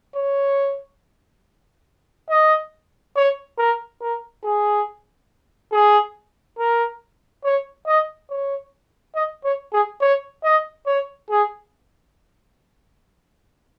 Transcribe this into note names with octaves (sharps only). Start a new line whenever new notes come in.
C#5
D#5
C#5
A#4
A#4
G#4
G#4
A#4
C#5
D#5
C#5
D#5
C#5
G#4
C#5
D#5
C#5
G#4